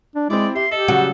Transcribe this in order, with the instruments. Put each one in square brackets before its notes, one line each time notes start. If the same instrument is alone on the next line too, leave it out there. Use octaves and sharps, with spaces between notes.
[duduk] D4
[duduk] G#3 [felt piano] C4 E4 [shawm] D5
[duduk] G4 [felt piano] E5 [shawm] C6
[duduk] G4 [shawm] A4 [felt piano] D#5
[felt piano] C#3 F#3 G3 [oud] F#4